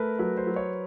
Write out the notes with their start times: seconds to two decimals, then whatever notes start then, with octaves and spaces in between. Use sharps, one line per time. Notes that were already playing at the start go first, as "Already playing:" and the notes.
Already playing: A3 A#4 B4
0.19 F#3 B4
0.37 C5
0.47 F#3
0.56 C#5